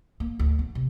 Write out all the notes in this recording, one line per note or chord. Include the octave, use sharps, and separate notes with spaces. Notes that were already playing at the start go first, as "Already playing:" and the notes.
A#3
D2
B3
C3